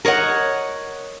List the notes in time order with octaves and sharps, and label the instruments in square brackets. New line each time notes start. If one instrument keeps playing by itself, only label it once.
[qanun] A#4 C#5 D#5 F#5